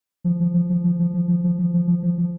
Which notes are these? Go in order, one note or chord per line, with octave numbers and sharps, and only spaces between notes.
F3
F3
F3
F3
F3
F3
F3
F3
F3
F3
F3
F3
F3
F3